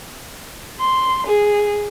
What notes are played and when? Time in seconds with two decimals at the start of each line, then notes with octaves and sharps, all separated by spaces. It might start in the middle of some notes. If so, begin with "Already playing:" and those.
0.80 C6
1.26 G#4